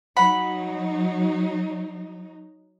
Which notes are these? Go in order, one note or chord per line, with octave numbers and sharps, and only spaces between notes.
F#3 D#4 F#5 B5